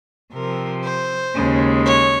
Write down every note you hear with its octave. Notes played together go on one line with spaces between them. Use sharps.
C3 F3 C4 A#4
C5
D#2 C#3 G#3
C#5